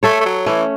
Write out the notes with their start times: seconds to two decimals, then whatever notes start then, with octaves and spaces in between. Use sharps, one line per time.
0.03 A3 A4 C#5
0.21 A3
0.25 F#3
0.46 E3 A3 C#4